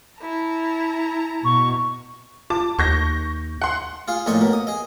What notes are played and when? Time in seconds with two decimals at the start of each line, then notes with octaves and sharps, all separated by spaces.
0.17 E4 A5 A#5
1.44 B2 C#6
2.50 F4 A5 D6
2.79 D#2 C#6 G6 A#6
3.62 F#5 C6
4.08 F4 G#4 F5
4.26 A#1 A2 F4 C#5 D#5 C#6
4.41 B2 A#3
4.53 D#6
4.67 G#4 D#5